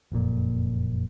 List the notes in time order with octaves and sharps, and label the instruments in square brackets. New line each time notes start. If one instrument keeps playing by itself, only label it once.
[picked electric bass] F#1 F2 A#2